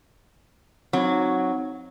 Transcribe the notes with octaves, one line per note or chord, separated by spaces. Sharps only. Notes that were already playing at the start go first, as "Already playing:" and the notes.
F#3 C4 D#4